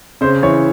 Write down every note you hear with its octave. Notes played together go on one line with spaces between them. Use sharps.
C#3 C5
E3 C#5